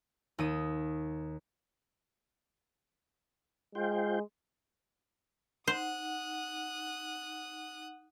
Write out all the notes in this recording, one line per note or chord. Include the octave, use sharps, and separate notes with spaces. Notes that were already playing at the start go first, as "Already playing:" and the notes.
D#2 D#6 D#7
G#3 F4 C5 G5
D#4 C5 F#5 D#6 F#6